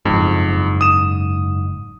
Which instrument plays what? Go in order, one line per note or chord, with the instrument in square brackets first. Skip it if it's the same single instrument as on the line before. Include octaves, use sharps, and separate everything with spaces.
[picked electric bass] F#1 G#2 [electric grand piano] F2
[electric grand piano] D#6 E7